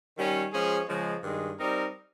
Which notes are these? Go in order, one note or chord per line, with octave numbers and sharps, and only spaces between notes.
D#3 G3 C#4
F3 G#3 C#4 G#4
C#3 F3 G#3
G2 D#3 G#3
G3 C4 D#4 A#4